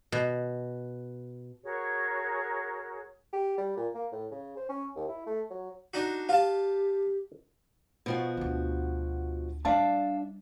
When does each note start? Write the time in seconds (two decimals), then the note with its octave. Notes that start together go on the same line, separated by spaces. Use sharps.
0.12 B2
1.63 F#4 G#4 A#4 C#5
3.33 G4
3.58 G3
3.77 A#2
3.94 A#3
4.12 A2
4.31 C#3
4.57 C5
4.69 C#4
4.96 D#2
5.08 E4
5.26 A3
5.50 F#3
5.94 D4 D#4 F#4
6.29 F4 G4 F5 A5
8.06 B2 F3 F#4
8.37 D2 D4
9.65 G3 D4 D5 E5 F5 A5